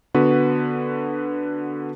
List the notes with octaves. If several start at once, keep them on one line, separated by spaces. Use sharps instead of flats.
D3 B3 F#4 B4